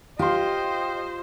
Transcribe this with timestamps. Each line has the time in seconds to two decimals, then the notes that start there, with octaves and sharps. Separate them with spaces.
0.19 F4 G4 C5 D#5 C6